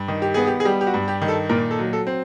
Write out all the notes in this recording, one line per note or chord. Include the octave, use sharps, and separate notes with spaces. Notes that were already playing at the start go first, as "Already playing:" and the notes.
Already playing: G2
D#3
G4
B3 G#4
G4
G#4
G3 G4
G4
F#4
G2
G4
D#3
A4
A#2 A#4
A4
F#3
A4
C4